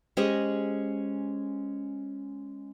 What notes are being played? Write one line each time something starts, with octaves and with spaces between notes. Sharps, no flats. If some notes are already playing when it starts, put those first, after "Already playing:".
G#3 C#4 G4 G#4 C5 D#5